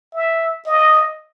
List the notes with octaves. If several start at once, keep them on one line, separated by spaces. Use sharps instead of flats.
E5
D#5